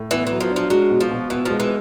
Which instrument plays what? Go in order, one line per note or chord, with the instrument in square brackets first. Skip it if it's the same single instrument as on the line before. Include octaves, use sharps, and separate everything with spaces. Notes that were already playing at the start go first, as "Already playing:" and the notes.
Already playing: [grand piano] A2
[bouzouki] E3 [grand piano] B3
[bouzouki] E3 [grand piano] F#3
[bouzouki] F3
[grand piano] D4
[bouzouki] F3
[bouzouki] F#3 [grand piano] G#3
[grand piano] B2
[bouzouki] F3
[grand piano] B2
[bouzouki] E3 [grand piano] B3
[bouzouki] F3 [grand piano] G#3
[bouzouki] E3